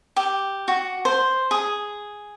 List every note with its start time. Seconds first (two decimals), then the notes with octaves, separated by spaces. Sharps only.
0.16 G4
0.68 F#4
1.05 C5
1.51 G#4